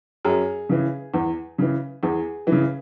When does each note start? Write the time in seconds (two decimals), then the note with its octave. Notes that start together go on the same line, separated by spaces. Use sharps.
0.25 F#2 G#4
0.69 C#3 E3
1.14 E2
1.58 C#3 E3
2.03 E2 G#4
2.47 C#3 E3